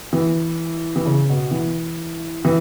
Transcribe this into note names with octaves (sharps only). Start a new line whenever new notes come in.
E3
E3
C#3
B2
E3
E3